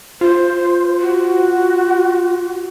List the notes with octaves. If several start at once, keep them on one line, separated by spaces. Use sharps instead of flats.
F4 C5
F#4